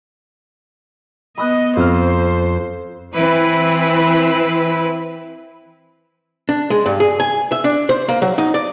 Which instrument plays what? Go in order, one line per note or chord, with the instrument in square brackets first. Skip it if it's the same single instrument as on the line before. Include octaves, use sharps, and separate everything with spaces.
[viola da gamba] B3 D#5 [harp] B5 D#6 F#6
[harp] F2 F6 [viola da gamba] C5
[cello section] E3 C4 E4 B4
[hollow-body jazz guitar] D4
G#3
G2
G#4
G#5
E5
D4
C5
A#3
F#3
D#4
D5